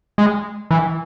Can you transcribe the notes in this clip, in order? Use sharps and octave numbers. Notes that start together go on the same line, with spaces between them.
G#3
E3